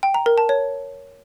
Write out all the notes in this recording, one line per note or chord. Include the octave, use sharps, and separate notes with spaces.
G5
A#5
A#4
A5
C#5